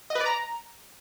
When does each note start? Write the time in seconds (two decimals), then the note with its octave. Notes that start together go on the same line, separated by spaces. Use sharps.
0.10 D#5
0.15 B4
0.21 D5
0.26 A#5